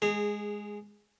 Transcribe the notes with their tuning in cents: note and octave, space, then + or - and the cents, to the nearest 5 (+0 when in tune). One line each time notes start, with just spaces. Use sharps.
G#3 +0 G#4 -15 A#5 -35